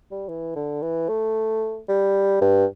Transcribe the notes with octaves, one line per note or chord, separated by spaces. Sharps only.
G3
E3
D3
E3
A3
G3
G2